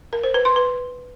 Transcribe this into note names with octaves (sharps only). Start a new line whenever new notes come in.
A#4
C5
B4
C6
B4